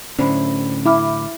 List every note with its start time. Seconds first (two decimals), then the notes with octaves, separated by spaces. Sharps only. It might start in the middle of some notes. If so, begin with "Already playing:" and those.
0.19 A2 D3 C#4 C5 B5
0.86 E4 B5 D6 F6